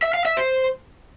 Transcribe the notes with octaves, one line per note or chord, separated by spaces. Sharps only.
E5
F5
E5
C5